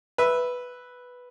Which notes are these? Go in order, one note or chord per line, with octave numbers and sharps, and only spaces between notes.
B4 E5